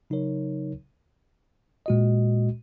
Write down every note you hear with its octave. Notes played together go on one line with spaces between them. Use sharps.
C#3 F#3 D#4 A#4 C#5
A#2 G#3 F#4 D#5